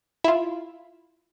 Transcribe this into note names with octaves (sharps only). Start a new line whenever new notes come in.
E4 F4